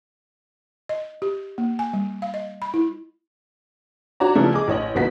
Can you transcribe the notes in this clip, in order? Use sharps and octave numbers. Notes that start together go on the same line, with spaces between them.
D#5
G4
A#3
G#5
G3
F5
D#5
B5
E4
F#4 C#5 D5 A#5
C#3 E3 F3 G3 A3 B3
G#4 D#5 D6
A1 C#5 D#5 F#7
G#1 B2 A#3 B3 F#4 B6